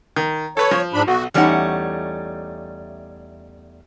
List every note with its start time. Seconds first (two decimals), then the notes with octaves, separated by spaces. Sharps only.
0.16 D#3
0.57 A4 B4 C#5
0.71 F3
0.94 G#2 D4 B5
1.08 B1 F#4
1.34 E2 G3 A3 C#4 D#4 F#5